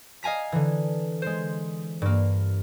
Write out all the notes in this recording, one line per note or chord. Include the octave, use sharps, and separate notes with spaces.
D#5 F5 G#5 A#5 B6
D3 E3
G#3 C5
G2 A#3